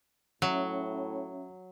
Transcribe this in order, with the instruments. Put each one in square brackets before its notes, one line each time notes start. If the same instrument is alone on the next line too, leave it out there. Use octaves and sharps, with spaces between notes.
[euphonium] A2 [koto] F#3 [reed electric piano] C#4 C#5 E5